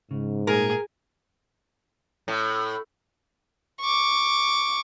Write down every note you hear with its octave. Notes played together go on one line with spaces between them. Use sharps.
G#2 C#3
A#2 A3 G#4 A#4
A2
C#6 D6